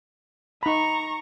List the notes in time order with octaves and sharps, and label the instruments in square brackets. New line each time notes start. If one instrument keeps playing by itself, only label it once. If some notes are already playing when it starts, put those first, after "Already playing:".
[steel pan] D#4 B5 [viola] A#5 C#6